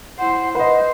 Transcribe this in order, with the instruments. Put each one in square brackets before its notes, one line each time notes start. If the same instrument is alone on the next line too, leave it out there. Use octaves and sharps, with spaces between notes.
[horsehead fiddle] E4 C5 [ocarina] F#5
[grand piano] B4 D#5 [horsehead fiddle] C5 [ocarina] F#5